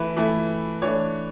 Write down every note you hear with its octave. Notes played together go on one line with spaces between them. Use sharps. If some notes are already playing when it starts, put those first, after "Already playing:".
Already playing: E3 A3 E4 B4
E3 A3 E4
E3 A3 D4 C#5